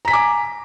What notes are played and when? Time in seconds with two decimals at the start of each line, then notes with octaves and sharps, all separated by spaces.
0.05 A#5
0.08 B6
0.11 G#5
0.13 D6